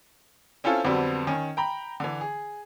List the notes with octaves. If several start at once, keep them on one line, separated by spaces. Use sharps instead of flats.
C4 C#4 E4 F4 A4
F2 D3 F#3 G3 B3 C4
D#3 C#4
G5 A#5 B5
D3 E3
G#4